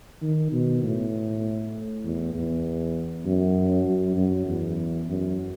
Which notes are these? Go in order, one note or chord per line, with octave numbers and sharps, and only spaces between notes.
D#3
B2
A2
E2
E2
F#2
F#2
F#2
E2
F#2